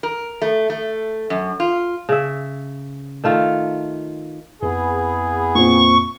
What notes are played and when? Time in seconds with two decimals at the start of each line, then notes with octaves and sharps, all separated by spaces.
0.03 A#4
0.42 A3
0.70 A3
1.30 F#2
1.60 F4
2.09 C#3 E5
3.24 D#3 A3 F4 F5
4.63 F2 B3 E4 G#4 B4
5.55 A#2 C4 C#6